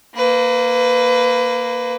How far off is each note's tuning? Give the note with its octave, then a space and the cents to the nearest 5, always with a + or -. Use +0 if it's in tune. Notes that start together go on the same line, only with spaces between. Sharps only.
A#3 +0 B4 +25